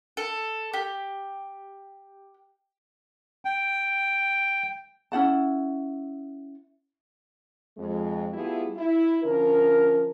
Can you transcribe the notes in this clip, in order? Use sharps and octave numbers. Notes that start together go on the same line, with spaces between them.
A4
G4
G5
C#4 E4 F#5 A5
F2 G#3
G3 A3 B3 E4 F4 G#4
E4
D3 F3 C#4 A#4